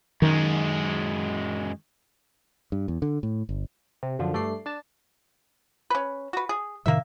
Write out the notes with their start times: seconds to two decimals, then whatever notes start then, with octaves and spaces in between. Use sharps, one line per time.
0.22 F#2 D#3 G#3
2.72 G2
2.88 E2
3.02 D3
3.23 A2
3.49 G1
4.03 C3
4.19 F#2 D3 F3
4.33 G2 A3 D5 C7
4.66 D4 A5
5.90 C#4 B4
6.33 F#4 B4
6.49 G#4
6.86 A2 C3 D#3 A#3 E5